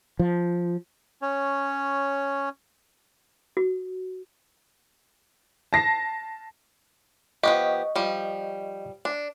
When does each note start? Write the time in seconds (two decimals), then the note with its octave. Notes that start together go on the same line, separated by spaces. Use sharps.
0.19 F3
1.22 C#4 C#5
3.57 F#4
5.73 A5 A#6 C7
7.43 F3 B3 G4 D#5 C#6
7.96 F3 G3
9.05 D4